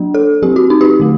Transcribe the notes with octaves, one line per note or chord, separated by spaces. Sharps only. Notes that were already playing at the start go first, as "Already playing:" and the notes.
Already playing: F#3 A#3 D4
A4
F#3 C4 G4
F#4
D#4
G4
F#4
D3 A3